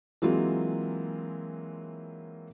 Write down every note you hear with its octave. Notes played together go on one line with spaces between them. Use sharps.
E3 F#3 G#3 A#3 C4 F4